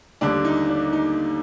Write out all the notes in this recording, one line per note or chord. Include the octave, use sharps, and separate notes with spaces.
D#2 D3 G3 D4
D#4
D4
D#4